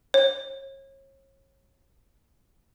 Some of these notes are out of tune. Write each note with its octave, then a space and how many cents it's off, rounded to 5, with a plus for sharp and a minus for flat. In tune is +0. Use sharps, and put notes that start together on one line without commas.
C#5 -35